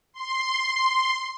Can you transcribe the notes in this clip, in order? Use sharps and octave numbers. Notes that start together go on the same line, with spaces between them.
C6